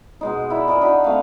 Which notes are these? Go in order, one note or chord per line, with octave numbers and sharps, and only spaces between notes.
B2 G#3 D#4
E4 A#4 D5
A#4 D5 D#5 G#5
D4 D#4 F#4 B5
A3 C4 F5